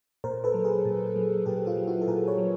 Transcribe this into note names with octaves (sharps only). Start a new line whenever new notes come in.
A#2 A#4 C5
A4 B4
F#3
G#4 A#4
A#2
F#3
A#2 G4 A4
F4 G4
F#3
E4 F#4
A4
A#2 G#4 A#4
B4 C#5
F#3